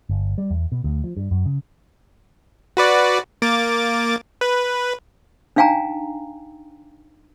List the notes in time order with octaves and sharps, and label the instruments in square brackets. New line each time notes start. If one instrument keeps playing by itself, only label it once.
[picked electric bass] G1
G3
E2
B2
D2
F3
G2
F#2
C#3
[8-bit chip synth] F#4 B4 D5
A#3 D6 A6
B4
[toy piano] D4 D#4 F5 G5 G#5 A#5